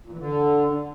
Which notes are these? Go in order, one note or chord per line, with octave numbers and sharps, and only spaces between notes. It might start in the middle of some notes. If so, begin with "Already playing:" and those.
A#2
E3
D3